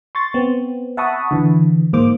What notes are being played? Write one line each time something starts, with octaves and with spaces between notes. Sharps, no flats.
C6 C#6 A6
B3 C4
E5 F#5 A5 B5 C#6 D#6
D3 E3
G#2 A#3 C5 D6